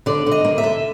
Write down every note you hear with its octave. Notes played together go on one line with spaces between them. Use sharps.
D3 D5
D3
D#5
A#3
E5
D3